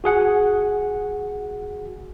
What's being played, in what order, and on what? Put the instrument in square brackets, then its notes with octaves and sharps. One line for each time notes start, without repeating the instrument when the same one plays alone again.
[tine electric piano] F#4 G#4 F#5 G#5